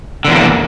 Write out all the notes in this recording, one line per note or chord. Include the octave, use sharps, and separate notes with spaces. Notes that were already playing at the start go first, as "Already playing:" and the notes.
E2 A#2 D3